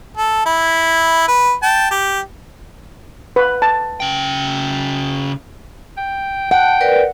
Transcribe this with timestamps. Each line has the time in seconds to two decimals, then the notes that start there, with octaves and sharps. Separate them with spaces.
0.17 A4
0.46 E4
1.28 B4
1.63 G5 A5
1.91 G4
3.36 B4
3.62 A5
4.00 C#3 G5
5.97 G5
6.51 F#5 G5 A5
6.81 A#4 B4 D5